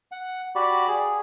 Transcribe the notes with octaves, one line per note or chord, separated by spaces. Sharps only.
F#5
F#4 G4 D5 B5
G#4